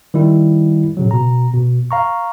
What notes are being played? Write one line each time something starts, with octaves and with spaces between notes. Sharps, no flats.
D#3 G3 E4
A#2 C#3 F#3
B2 A#5
B2
F5 A#5 C#6